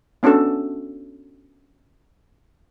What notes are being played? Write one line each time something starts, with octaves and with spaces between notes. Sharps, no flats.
B3 C#4 D4 F#4 A4